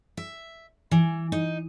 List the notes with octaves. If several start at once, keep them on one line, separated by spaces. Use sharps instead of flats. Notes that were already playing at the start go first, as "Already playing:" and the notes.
E5
E3
D#4